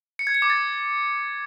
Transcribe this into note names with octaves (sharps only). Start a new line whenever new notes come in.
C#7
G#6
C#7
D6
A6